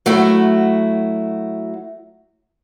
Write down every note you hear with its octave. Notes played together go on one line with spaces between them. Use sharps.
F#3 A3 E4 F#4